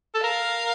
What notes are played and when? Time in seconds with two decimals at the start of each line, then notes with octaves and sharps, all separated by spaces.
0.15 A4
0.23 A#4 F5